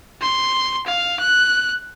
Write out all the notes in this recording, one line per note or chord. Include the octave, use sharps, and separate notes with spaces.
C6
F5
F#6